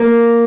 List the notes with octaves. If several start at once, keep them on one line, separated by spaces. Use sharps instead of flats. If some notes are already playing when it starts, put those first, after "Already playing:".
Already playing: A#3